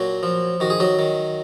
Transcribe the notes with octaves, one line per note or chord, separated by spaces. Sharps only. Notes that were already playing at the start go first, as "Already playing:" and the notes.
Already playing: A#2 F#3 F#4
F3
D#3 F#4
G#4
F#3 F#4
D#3